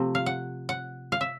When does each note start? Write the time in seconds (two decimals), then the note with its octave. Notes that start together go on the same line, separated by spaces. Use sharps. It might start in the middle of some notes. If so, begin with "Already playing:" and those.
Already playing: C3 F3 A3
0.15 F5
0.26 F#5
0.69 F#5
1.12 F5
1.21 E5